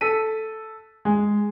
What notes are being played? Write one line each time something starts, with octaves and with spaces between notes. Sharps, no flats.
A4 B6 D#7
G#3